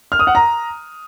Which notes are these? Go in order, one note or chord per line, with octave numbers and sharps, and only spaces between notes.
F6
D#6
F#5
A#5